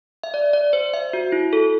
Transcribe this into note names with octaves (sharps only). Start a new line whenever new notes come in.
E5
D5
D5
C5
E5
F#4
E4
A4